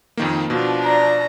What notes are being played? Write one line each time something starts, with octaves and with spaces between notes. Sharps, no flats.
F2 D#3 A#3
B2 F3 D4
D5 A#5